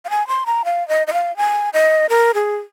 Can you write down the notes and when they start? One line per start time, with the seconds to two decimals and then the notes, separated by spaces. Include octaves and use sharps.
0.05 F5
0.10 G#5
0.28 C6
0.46 A#5
0.65 F5
0.88 D#5
1.07 D#5
1.13 F5
1.37 G#5
1.73 D#5
2.10 A#4
2.34 G#4